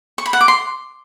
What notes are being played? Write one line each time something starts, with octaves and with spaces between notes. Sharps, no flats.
C#6
B5
F#5
D6
C6